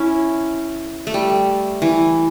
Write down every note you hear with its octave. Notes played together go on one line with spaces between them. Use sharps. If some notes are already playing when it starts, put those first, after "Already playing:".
Already playing: C#4 E4
A3
G3
E3